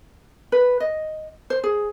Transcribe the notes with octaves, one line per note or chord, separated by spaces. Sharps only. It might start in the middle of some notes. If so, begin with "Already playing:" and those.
B4
D#5
C5
G#4